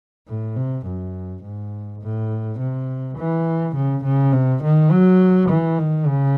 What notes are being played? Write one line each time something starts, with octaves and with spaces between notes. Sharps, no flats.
A2
C3
F#2
G#2
A2
C3
E3
C#3
C#3
C3
D#3
F#3
E3
D#3
C#3